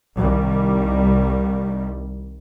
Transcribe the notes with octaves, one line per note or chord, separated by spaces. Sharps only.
C2 D#3 G3